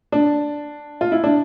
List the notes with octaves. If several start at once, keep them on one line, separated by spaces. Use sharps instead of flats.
D4
F4
E4
D4